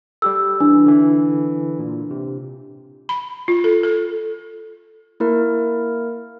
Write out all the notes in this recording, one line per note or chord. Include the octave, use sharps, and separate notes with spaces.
G3 G4 A4 E6
E3 D4
D3 E3
A#2
C3
B5
F4
A4
A4
A#3 E4 A#4